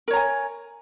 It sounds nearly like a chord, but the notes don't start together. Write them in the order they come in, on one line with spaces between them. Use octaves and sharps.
A#4 C#5 A#5 G#5